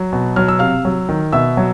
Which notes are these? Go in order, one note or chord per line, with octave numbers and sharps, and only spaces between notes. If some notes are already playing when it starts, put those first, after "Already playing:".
Already playing: F#3
B2
F#3 F6
E6
C3 F5 F6
F#3
D#3
B2 E5 E6
F#3